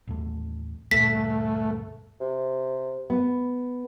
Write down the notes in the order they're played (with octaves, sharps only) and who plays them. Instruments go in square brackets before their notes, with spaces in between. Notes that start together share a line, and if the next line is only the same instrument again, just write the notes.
[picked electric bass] A1 D#2 A3
[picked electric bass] D2 G2 A#2 [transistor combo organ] A3 [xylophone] B6
[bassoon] C3
[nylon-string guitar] B3